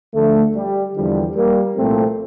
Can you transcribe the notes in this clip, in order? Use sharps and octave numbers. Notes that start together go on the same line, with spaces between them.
D2 D3 F3 A3
G3
E2 D3 F3 G3
G3 A#3
C2 A#2 F3 A3 C4